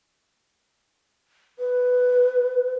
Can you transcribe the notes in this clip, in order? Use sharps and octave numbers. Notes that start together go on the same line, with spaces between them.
B4